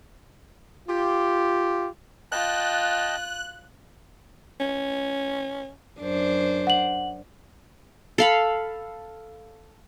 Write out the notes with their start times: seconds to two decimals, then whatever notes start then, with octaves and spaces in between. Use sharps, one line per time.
0.88 F4 G4
2.32 F4 D#5 G5 A5 F#6
4.60 C#4
6.00 F#2 D4 C5
6.67 F#5 F#7
8.18 A4 F5 B5